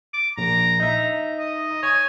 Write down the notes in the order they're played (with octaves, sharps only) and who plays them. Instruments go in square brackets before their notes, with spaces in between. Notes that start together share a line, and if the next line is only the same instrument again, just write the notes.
[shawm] D6
[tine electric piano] A#1 [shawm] A#5
[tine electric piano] D#4 E5
[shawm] D#5
[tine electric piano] C#5 [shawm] G#5